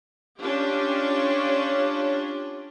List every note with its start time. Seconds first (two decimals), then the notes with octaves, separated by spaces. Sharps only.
0.39 C#4 D4 F4 G4